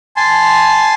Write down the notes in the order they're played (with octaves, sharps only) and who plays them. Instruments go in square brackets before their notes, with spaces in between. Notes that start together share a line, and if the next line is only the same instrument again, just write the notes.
[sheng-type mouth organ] G#5 A5 C6